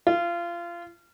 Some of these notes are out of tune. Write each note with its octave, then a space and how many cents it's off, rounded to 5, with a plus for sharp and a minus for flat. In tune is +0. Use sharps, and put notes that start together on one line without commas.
F4 -25